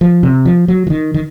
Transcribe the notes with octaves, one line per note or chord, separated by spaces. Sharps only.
F3
C3
F3
F#3
F3
D#3
D#3